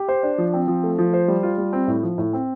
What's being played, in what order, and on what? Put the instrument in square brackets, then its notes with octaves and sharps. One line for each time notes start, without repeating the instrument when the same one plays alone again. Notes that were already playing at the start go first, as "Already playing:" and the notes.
Already playing: [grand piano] G4
C5
D4
F3
C4
F3
A3
F3
C5
G3
F4
G3
C4
A2
F3
A2
C4